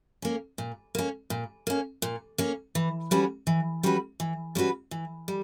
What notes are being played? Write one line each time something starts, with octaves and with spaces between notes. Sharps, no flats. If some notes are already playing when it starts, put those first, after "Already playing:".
A#3 C#4
A#2
A#3 C#4
A#2
A#3 C#4
A#2
A#3 C#4
E3
G3 C#4 F#4 B4
E3
G3 C#4 F#4 B4
E3
G3 C#4 F#4 B4
E3
G3